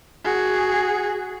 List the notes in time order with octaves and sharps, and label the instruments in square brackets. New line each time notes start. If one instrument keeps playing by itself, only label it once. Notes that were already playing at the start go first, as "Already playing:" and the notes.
[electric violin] F#4 G#4